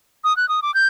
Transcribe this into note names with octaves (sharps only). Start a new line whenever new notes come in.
D#6
F#6
D#6
D6
G6